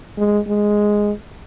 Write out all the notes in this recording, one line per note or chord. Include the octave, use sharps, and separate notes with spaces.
G#3
G#3